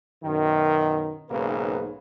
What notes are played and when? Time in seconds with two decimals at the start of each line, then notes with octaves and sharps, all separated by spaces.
0.24 F#2 B2 D#3
1.29 B1 G#2 C#3 A#3 B4